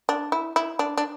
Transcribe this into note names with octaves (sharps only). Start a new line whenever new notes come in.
D4
E4
E4
D4
D4